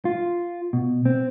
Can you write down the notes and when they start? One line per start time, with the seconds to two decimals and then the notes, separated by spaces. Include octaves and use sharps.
0.05 F4
0.73 B2
1.05 C4